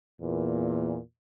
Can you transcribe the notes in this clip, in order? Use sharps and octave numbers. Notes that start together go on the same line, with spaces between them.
E2 A#2